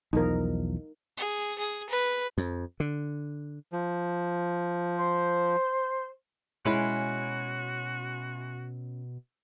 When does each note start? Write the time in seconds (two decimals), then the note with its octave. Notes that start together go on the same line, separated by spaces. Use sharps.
0.13 B1 E2 F3 D#4 A#4
1.17 G#4
1.58 G#4
1.89 B4
2.38 F2
2.80 D3
3.73 F3
4.98 C5
6.65 B2 G#3 C#4 E4 F#4 B4